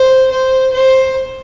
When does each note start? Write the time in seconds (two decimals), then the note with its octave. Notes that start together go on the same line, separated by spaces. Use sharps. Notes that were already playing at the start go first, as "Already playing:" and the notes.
Already playing: C5
0.31 C5
0.72 C5